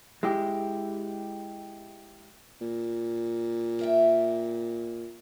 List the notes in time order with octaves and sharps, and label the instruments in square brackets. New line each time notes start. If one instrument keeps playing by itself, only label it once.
[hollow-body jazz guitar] G#3 E4 G4
[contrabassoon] A#2
[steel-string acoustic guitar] A#4 E5 G5